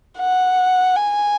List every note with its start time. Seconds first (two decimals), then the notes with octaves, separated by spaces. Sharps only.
0.19 F#5
0.96 G#5